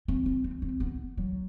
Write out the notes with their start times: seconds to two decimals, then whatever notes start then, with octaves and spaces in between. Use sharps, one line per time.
0.08 C4
0.26 C4
0.44 C4
0.62 C4
0.80 B3
1.17 F#3